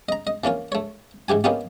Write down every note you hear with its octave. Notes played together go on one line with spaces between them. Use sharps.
D#5 A#5
D#5
E3 A#3 C#4 F4
A3 C#5
G#2 E3 G4 G#5
A#3 B3 C#4 D#4 F4 G4